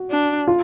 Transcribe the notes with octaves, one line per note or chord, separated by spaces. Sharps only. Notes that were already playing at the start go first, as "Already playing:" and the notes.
Already playing: F#4
D4
F4